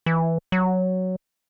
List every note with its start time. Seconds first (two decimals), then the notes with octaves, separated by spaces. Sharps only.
0.06 E3
0.52 F#3